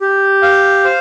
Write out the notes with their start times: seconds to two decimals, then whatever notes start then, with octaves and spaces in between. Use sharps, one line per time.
0.01 G4
0.42 F5
0.84 C5